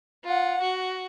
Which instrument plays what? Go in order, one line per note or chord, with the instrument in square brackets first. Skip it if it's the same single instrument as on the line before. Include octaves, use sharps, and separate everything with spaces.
[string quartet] F4 F#5
F#4